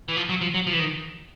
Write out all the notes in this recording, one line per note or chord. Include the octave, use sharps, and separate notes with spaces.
E3
F3
F#3
F3
F#3
F3
E3
D#3